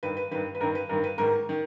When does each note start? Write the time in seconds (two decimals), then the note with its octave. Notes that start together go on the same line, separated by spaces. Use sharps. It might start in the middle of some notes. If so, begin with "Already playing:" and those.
0.03 G2 D#3 B4
0.17 B4
0.31 G2 D#3 B4
0.55 B4
0.60 G2 D#3 A#4
0.75 B4
0.89 G2 D#3 A#4
1.04 B4
1.18 G#2 D#3 A#4
1.49 D#3